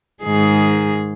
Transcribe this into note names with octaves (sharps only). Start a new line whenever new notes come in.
G#2 D#3 G#4